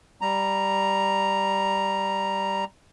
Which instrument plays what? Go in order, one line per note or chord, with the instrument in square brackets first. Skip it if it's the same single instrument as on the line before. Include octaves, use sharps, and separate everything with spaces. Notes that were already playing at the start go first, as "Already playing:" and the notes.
[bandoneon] G3 A#5